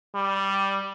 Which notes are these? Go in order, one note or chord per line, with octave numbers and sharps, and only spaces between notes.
G3